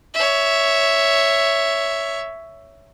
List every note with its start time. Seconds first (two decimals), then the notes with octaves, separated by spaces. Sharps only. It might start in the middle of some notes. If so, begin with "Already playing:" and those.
0.14 C#5 E5